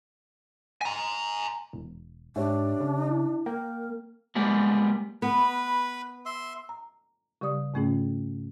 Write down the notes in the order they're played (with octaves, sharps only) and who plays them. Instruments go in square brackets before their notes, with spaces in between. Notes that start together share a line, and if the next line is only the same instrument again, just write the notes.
[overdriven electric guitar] G#5 A#5
[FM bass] E1
[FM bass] G#2 [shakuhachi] D4 [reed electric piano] G4 C#5 E5
[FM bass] C#3
[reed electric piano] E4
[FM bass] A#3 [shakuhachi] A#4 [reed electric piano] G5
[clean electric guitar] G3 G#3 A#3 B3
[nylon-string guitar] B3 [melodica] B4 B5
[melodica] E5 C6
[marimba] A#5
C#3 G3 G4 D5 D#6
G#2 C#3 A3 C#4 F4 G#4